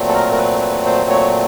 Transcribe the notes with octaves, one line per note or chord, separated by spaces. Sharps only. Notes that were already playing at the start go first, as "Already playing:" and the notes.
Already playing: A#2 F#3 A3 C4
A4
A#4
A#4
B4
B4
C5
C#5